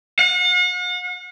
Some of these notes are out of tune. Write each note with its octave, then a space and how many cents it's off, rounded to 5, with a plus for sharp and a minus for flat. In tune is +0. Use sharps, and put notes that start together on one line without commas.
F#5 -45